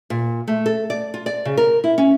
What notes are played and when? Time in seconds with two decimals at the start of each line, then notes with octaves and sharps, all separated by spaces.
0.10 A#2
0.48 A3
0.66 A4
0.90 D5
1.14 F4
1.26 D5
1.45 C#3
1.57 A#4
1.84 E4
1.98 C#4